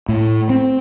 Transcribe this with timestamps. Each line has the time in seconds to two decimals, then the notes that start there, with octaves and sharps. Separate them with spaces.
0.09 A2
0.50 C4